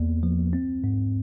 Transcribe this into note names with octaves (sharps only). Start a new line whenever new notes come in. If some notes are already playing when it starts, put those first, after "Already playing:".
Already playing: E2 A#3 B3
F3
C4
G#2